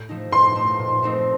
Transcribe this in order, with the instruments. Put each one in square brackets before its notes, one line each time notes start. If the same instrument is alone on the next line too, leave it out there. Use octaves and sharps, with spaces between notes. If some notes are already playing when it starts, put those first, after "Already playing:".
Already playing: [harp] A2
F3 A3 D#4
[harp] A2 [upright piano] C6
[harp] F3 A3 D#4
A#2
A3 C4 D#4